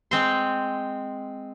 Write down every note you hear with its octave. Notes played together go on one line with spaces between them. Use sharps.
G#3 C4 C6